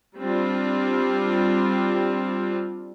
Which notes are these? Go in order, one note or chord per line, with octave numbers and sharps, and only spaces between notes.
G3 C4 D4 F4